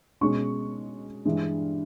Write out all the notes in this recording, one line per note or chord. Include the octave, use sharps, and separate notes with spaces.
B2 G#3 C#4 C#6
G2 E3 G#3